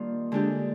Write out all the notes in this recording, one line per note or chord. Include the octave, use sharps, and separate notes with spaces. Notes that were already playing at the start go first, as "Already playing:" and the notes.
Already playing: D#3 G3 A#3 D4 F4
D3 G#3 D4 G4